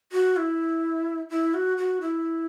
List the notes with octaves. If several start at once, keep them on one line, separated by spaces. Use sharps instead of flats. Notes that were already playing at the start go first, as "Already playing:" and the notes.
F#4
E4
E4
F#4
F#4
E4